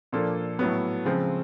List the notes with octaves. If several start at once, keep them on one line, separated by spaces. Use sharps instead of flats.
A#2 F3 A#3 D4 A4
A2 F#3 B3
C#3 F3 G#3 C4